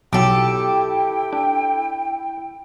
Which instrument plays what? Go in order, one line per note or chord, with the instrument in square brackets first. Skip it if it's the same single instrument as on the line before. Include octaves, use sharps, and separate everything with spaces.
[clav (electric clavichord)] B1 F#3 [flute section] E4 G5 [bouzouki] G4 A4
[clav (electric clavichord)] D4